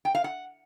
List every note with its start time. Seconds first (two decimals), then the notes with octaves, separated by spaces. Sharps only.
0.05 G5
0.15 F5
0.24 F#5